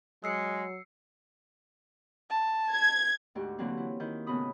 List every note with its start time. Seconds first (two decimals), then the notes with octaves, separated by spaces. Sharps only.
0.24 F#3 G#3 E6 C7 C#7
2.30 A5
2.72 G#6
3.35 D2 G#2 F#4 G4
3.58 D3 E3 F#3 A#3 C4
3.77 E4
4.00 D#3 E4 G6
4.27 A2 C#3 B3 F#4 B5 D#6